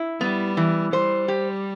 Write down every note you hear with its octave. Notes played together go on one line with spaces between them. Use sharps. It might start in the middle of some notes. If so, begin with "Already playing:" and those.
Already playing: E4
G3 B3
E3
G3 C5
G4